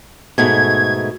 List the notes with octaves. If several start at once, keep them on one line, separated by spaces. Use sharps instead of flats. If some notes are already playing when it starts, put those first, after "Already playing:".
G#2 B2 A3 G#6